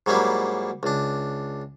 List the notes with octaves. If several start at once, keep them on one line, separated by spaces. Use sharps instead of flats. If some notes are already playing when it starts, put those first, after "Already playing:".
G#2 F#3 G3 A#3 E4
C#2 D4